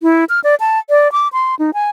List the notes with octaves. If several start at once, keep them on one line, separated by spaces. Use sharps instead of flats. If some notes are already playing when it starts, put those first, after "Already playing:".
E4
F6
D5
A5
D5
D6
C6
D#4
G#5